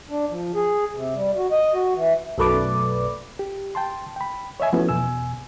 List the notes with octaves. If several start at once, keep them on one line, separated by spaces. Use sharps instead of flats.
D4
F3
G#4
C3
G3
F#4
D#5
F#4
E3
B1 F#2 A3 B4 D5 D6
G4
G5 A5 C6
G5 B5
C#5 D#5 E5 G#5
F3 A3 B3 C#4 E4 F#4
E2 B2 G#5 E6